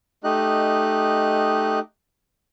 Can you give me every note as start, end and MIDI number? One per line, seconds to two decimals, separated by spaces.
0.24 1.79 57
0.24 1.79 63
0.24 1.79 67
0.24 1.79 75
0.24 1.79 90